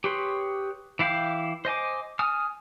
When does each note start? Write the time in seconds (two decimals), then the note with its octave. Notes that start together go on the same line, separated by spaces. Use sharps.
0.04 G4 G#4 B4 C#5 C6
0.99 E3 E4 F5 G5 D6
1.65 C5 D#5 G#5 D6
2.19 G#5 D#6 F6